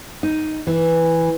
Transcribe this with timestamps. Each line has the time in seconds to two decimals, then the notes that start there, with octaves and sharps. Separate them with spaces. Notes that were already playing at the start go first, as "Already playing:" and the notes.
0.23 D#4
0.67 E3